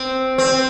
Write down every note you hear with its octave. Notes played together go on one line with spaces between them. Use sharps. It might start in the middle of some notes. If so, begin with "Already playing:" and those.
Already playing: C4
C4